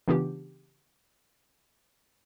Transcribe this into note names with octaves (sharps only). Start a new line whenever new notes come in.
C#3 E3 B3 D4 F4 G4